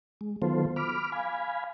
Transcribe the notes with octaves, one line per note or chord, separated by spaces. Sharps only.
G#3
D#3 F#3 B3 F4 A4 C5
B5 D6 F6
F5 G#5 B5